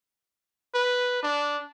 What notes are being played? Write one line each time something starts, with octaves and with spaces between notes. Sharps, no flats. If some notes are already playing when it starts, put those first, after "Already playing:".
B4
D4